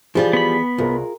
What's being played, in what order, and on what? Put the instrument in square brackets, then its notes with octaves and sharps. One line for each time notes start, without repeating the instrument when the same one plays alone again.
[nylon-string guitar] E3 G#4 [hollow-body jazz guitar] F3 G3 F4
[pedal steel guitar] B3 B5
[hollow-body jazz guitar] C2 [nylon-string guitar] F4 G#4 A#4